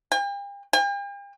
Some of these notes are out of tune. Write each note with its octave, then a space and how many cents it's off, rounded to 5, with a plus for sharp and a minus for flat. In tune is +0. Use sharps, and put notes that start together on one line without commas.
G5 +40
G5 +45